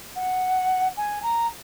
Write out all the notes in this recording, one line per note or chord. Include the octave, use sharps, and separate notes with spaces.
F#5
G#5
A#5